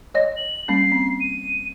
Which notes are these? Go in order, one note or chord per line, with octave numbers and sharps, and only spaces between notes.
C#5 D#5 A#6
F#7
G3 A#3 C#4 C7
C4
D#7